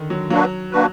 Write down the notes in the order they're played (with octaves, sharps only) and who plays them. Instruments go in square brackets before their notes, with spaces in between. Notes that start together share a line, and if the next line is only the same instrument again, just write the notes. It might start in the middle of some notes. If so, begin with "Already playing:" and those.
Already playing: [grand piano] D3 D#3
F#3
[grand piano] F#3 [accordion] A#3 D4 F#4 B4
[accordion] A#3 D4 F#4 B4